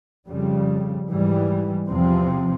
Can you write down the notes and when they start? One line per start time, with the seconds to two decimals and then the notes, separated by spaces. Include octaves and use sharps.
0.27 F2 C#3 G3
1.07 G#2 E3 G3
1.88 E2 C3 F3 C4